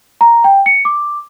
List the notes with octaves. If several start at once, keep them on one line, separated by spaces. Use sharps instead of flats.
A#5
G5
C#7
D6